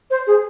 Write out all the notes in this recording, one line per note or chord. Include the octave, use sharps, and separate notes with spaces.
C5
G#4